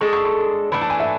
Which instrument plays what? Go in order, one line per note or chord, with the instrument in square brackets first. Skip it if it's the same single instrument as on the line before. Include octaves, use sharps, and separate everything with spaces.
[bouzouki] G#3 D4 A4 [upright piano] C#6
[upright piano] C#6
C#6
[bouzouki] E3 A3 D4 [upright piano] B5
[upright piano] A5
G#5
E5